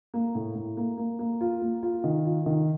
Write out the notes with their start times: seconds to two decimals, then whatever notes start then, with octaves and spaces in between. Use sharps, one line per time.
0.14 A#3
0.35 A2
0.55 A2
0.77 A#3
0.98 A#3
1.19 A#3
1.41 F4
1.62 A#3
1.83 F4
2.04 D#3
2.25 F4
2.46 D#3